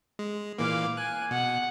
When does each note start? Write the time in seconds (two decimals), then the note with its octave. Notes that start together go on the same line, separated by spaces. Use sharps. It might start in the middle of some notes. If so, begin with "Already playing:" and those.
0.19 G#3
0.59 A#2 E3 A#3 F5 D6
0.97 G#5 F#6
1.31 B2 F#5